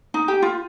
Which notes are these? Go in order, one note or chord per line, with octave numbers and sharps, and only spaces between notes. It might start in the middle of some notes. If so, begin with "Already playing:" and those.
D#4
G4
F4